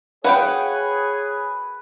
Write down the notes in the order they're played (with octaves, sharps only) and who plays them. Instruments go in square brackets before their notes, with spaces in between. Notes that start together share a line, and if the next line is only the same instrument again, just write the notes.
[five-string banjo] F#4 F5 G5 [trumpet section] G#4 [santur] B4 [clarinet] C#5